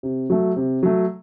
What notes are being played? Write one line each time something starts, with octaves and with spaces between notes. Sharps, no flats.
C3
F#3 A3
C3
F#3 A3